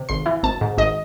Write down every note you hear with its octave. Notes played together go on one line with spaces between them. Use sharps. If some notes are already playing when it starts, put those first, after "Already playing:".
Already playing: C3
G#1 C6
E3
G#1 A5
G#2
G#1 D#5